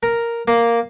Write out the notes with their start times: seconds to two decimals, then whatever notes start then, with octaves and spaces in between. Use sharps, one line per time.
0.03 A#4
0.48 A#3